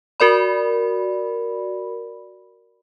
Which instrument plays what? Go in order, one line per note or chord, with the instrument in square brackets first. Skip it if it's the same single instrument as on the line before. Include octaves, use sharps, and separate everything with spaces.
[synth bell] F#4 A#4 D5 B5